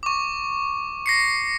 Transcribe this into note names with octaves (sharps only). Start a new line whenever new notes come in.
C#6 D6
A#6 C7 C#7